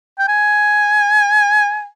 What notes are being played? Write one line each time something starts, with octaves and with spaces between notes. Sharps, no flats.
G5
G#5